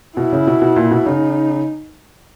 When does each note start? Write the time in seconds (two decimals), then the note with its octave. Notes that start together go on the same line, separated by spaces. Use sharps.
0.17 B2 E4
0.32 C#3
0.47 B2
0.62 B2
0.76 A#2
0.91 B2
1.06 C#3 D#4